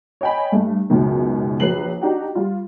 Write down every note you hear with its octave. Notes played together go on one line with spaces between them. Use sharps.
C#5 D#5 G5 G#5 B5
G2 A3
F#1 C#2 F#2 B2 D#3
A#1 F#3 B4 C7 F#7
D4 D#4 F#4 G4 F#5 G5
G3 F4